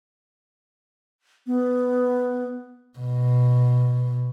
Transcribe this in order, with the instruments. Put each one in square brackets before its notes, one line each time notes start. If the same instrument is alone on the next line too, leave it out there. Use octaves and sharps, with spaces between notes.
[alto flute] B3
[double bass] B2